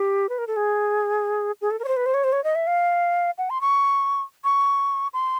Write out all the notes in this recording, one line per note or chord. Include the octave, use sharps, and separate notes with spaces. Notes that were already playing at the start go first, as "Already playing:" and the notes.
Already playing: G4
B4
A#4
A4
G#4
G#4
A4
A#4
C#5
C5
B4
C5
C#5
C5
C#5
D#5
E5
F5
F#5
C6
C#6
C#6
C6